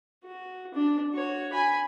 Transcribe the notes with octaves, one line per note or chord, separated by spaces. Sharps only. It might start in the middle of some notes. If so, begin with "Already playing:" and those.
F#4
D4
F#4 C#5
G#5 B5